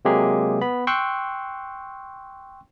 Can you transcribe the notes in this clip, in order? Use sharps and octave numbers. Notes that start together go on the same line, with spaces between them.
C3 F#3 G#3 A#3 G4 G#4
B3 B5
G5 C6 C#6 E6 F#6